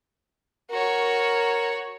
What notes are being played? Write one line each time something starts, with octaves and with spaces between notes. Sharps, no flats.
F#4 A#4 C#5